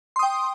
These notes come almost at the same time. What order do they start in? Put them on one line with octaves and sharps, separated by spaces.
C6 D#6 G5